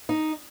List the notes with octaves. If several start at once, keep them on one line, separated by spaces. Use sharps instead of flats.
D#4